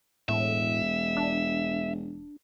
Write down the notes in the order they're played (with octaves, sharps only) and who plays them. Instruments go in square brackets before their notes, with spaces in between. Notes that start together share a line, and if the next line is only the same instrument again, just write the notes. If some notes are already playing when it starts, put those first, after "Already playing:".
[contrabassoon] E1 [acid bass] A2 [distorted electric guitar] E5
[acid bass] D4